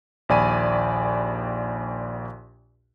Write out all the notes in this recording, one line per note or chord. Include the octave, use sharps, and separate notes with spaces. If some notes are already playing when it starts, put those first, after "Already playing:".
A#1 D#2 D5 G#5 B5 D#7